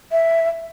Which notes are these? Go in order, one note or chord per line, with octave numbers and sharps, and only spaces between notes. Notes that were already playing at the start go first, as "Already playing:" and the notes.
E5